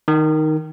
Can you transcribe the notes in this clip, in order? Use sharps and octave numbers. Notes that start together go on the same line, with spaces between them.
D#3